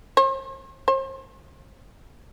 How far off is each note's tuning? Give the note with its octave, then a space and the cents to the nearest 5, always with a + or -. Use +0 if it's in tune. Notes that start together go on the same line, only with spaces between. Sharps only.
C5 +45
C5 +40